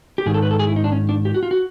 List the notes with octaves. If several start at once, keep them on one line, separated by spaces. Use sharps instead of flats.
G4
G#2 D#3 G#4
A4
B4
A4
G#4
E4
D#4
D4
C#4
D4
G4
F#4
F4
F#4